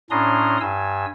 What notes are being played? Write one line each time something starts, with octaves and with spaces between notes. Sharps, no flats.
A2 C#4 D4 A#5 C6 D#6
G2 G#5 E6